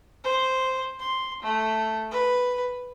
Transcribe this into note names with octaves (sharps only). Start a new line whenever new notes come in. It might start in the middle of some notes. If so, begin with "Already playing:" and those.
C5
C6
A3
B4